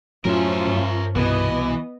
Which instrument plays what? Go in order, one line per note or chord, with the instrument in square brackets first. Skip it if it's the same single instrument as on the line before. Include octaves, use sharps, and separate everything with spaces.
[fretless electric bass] F#2 A2 F#3 [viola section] F3 C#4 F4 [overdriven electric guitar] A#4 E5
[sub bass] G2
[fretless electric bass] C2 B2 [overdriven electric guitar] E3 [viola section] B3 D#5